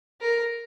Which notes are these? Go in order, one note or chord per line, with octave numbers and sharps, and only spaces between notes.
A#4